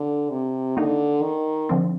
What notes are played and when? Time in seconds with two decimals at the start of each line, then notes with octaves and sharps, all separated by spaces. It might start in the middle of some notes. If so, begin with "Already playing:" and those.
Already playing: D3
0.30 C3
0.76 D3 D#3 A#3 D#4
1.22 D#3
1.69 D3 F3 C4